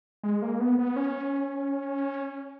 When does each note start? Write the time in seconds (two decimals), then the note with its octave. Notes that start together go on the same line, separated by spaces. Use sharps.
0.23 G#3
0.42 A#3
0.60 B3
0.79 B3
0.96 C#4